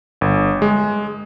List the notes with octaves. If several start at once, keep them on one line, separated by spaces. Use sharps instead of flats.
G1
G#3